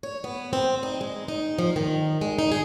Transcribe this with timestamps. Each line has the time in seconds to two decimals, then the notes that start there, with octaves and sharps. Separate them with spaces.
0.03 C#5
0.24 B3
0.53 C4
0.83 D#4
1.01 G#3
1.28 D#4
1.59 F3
1.76 D#3
2.21 G#3
2.39 D#4
2.52 G#4